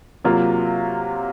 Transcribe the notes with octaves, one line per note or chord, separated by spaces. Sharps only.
C3 F#3 A#3 F4